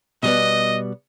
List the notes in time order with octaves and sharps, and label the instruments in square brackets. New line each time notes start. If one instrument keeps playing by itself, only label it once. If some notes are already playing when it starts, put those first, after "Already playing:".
[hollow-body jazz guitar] B2 G3 B3 [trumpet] D#5